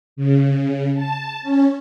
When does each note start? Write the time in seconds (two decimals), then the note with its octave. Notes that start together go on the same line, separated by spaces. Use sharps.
0.16 C#3
0.95 A5
1.43 C#4